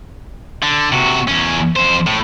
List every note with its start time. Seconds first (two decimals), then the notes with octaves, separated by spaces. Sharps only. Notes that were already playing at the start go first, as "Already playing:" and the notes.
0.63 D3
0.92 C3 F#4
1.28 E2 C#4
1.76 F2 C5
2.06 A2